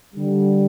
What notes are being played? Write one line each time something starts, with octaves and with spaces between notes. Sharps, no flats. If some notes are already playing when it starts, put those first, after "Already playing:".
D3 G3